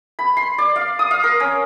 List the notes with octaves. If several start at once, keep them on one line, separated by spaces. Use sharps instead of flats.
B5
C6
D5
F5
D#6
F5
A#4
C#4